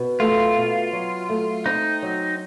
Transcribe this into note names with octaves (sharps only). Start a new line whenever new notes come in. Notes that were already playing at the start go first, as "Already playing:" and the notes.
Already playing: B2
A3 F4
B2
F#3
A3
C4 D#4
F#3